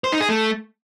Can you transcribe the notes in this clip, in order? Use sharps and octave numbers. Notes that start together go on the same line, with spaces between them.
C5
D#4
G#4
A3